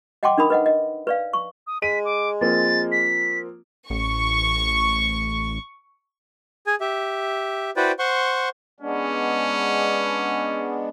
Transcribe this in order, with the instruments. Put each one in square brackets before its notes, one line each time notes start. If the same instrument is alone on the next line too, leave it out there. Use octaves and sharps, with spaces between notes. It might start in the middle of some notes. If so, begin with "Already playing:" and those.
[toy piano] D#5 F#5 G5 A5 C6 D6
D4 D#4 A#4 B5 D#6
B4 D#5 F#5
D#5
B4 D5 F5
C#6
[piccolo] D#6
[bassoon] G#3 [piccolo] B6 [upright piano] D#7
[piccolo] D6
[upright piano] F3 A#3 C4 [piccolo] A6
[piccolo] B6
[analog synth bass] A1 [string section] C#6
[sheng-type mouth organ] G#4 G#5
G4 E5
E4 F#4 B4 C5 D5 G5
C5 F#5 C6 C#6
[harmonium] G#3 B3 D4 [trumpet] C#4